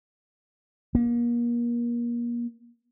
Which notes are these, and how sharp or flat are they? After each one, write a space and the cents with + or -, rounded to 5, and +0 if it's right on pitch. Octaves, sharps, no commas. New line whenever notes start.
A#3 +35